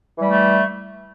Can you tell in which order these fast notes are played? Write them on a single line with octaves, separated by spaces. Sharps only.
E3 G3 A3